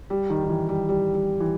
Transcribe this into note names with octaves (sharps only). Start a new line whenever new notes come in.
G3
D#3
D#3
E3
G3
G3
G3
E3